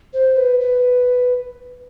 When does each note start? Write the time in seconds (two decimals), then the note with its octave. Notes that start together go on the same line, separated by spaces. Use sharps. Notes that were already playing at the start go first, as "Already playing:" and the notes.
0.13 C5
0.37 B4
0.60 B4